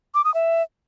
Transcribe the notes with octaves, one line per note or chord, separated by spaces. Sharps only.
D6
D#6
E5